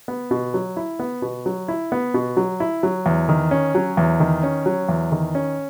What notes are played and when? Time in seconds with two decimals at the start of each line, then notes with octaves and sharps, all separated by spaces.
0.08 B3
0.31 B2
0.54 F#3
0.77 E4
0.99 B3
1.22 B2
1.46 F#3
1.68 E4
1.92 B3
2.14 B2
2.37 F#3
2.60 E4
2.83 F#3
3.06 E2
3.29 D#3
3.51 C#4
3.75 F#3
3.97 E2
4.20 D#3
4.43 C#4
4.66 F#3
4.89 E2
5.12 D#3
5.35 C#4